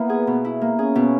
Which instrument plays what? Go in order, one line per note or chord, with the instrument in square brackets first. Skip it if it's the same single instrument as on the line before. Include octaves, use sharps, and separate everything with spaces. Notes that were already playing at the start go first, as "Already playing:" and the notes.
Already playing: [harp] A#3 E4 [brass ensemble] B3
[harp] G#4
B2
E4
A#3
[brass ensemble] C#4 [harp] G#4
[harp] B2